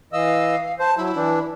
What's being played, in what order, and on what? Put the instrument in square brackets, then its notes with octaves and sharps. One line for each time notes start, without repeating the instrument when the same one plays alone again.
[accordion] E3 D#5 E6 [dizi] F5
[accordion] C5 [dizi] A5
[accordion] F#3 [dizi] E4
[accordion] E3 D4